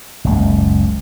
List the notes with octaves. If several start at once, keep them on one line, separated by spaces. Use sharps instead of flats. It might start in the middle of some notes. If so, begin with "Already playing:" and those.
F#1 C#2